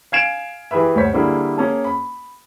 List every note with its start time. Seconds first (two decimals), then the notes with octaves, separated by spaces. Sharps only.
0.12 F5 G#5 G#6 C7 D7 E7
0.71 E3 G4 G#4 B4 E5
0.96 D2 G2 C5 C#5 B6
1.13 D3 G3 A#3 E4 G#4
1.58 A#3 C#4 G#4 A5
1.84 B5